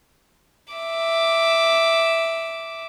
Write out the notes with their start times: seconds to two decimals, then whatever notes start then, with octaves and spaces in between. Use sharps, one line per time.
0.74 E5 D6